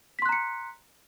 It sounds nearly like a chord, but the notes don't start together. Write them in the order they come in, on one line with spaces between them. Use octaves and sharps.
B6 C6 F#6 A#5 C#7